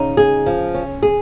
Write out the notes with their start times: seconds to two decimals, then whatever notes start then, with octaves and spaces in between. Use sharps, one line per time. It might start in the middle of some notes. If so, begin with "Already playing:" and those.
Already playing: C#3 D#4
0.17 G#4
0.46 F3
0.74 C#4
1.03 G#4